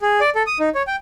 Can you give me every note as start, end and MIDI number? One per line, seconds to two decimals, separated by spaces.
0.02 0.20 68
0.21 0.30 74
0.35 0.43 69
0.47 0.58 87
0.60 0.69 63
0.75 0.83 73
0.87 0.96 79